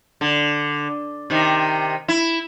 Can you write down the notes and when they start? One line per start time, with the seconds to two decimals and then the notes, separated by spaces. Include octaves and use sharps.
0.21 D3
1.30 C3 D#3
2.08 E4